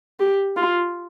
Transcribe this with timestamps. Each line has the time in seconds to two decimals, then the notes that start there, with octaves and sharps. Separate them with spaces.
0.20 G4
0.57 F4